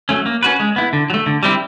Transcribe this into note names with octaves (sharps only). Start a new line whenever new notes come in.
F#3 A3 C#4
A#3
C#4 F#4 B4
G#3
B3 E4
D3
F#3
A3
D3
G3 C4 E4